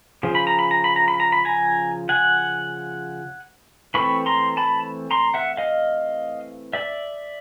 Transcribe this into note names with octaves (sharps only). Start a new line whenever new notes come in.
C#3 F3
B5
A#5
B5
A#5
B5
A#5
B5
A#5
B5
G#5 A#5
F#5 G#5
E3 A3 C4 B5 C#6
A#5 C6
A5 B5
A#5 C6
E5 F#5
D#5 F5
D5 E5